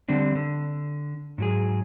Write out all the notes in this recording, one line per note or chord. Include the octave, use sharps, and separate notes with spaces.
D3 G3 C4 D4
D3
G#2 F#3 G#4